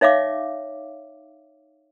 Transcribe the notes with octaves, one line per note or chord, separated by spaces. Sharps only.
D#4 C#5 E5 F5 D6